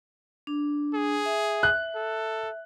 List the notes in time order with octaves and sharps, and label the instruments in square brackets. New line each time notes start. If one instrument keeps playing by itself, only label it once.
[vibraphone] D4
[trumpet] G#4
[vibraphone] E5
[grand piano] F#6
[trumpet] A4